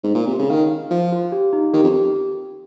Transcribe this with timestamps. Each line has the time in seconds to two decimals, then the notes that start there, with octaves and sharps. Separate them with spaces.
0.03 G#2
0.15 A#2
0.26 C3
0.39 C#3
0.50 D#3 F5
0.71 F5
0.91 F3 F5
1.12 F4
1.32 G4
1.53 D#4
1.74 D#3 G4
1.84 F2
1.94 G4